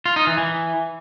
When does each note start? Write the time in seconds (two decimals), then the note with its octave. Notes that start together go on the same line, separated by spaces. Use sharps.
0.06 F4
0.16 D#4
0.27 E3
0.38 E3